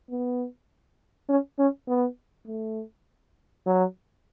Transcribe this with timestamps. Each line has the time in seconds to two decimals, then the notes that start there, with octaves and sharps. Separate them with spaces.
0.10 B3
1.29 C#4
1.59 C#4
1.88 B3
2.47 A3
3.66 F#3